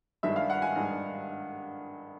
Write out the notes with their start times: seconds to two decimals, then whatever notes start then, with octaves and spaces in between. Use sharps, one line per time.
0.23 G2 D#3 G#3 E5
0.36 F5
0.50 F#5
0.62 G#5
0.76 G2 D#3 G#3